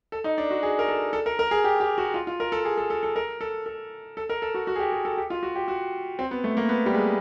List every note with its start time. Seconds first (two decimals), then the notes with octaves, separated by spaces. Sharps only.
0.12 A4
0.24 D#4
0.38 D4
0.51 F#4
0.63 G#4
0.79 A#4
0.88 A4
1.13 A4
1.26 A#4
1.39 A#4
1.51 G#4
1.64 G4
1.80 G4
1.98 F#4
2.14 F4
2.27 F4
2.40 A#4
2.52 A4
2.65 G#4
2.78 A4
2.90 A4
3.03 A4
3.16 A#4
3.41 A4
3.66 A4
4.17 A4
4.29 A#4
4.42 A4
4.54 F#4
4.67 F#4
4.76 G#4
4.79 G4
4.92 G#4
5.05 A4
5.17 G4
5.30 F4
5.43 F#4
5.56 G4
5.68 F#4
6.19 C4
6.31 B3
6.44 A3
6.57 A#3
6.69 B3
6.86 G3
6.95 G#3